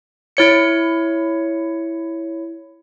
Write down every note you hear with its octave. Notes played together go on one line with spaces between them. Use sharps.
E4 C#5 C#7